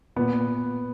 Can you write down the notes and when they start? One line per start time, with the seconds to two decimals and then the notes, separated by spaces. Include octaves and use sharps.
0.16 A#2 B3